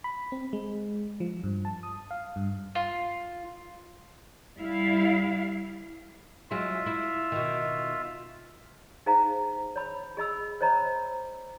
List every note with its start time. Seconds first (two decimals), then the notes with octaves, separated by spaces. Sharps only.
0.04 B5
0.32 C4
0.53 G#3
1.20 F3
1.44 G2
1.65 A5
1.83 D#6
2.11 F5
2.36 G2
2.75 F4
4.57 G3 E4 F5
6.51 F#3 G#3 E4 F4 E5
6.86 E4
7.32 B2 D#3
9.06 D#4 G#4 C5 F5 A#5
9.76 C#5 B5
10.17 G#4 D#5 B5 E6
10.61 C5 C#5 D#5 A#5 B5